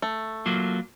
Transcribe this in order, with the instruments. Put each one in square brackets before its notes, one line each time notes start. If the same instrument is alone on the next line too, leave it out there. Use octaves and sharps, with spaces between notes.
[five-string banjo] A3
[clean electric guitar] F#3 A#3 F4